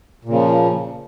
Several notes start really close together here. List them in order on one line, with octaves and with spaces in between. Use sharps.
A#2 C#3 F3